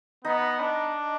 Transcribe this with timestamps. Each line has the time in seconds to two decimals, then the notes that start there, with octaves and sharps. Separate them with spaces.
0.24 B3 D#4
0.60 D4